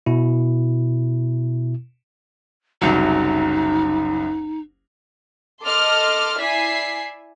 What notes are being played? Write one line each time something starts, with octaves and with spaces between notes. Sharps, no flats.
B2 E4
F#1 C2 F#3 D#4
A4 D#5 C6 D6 F6
E4 D5 E5 G#5 B6 C7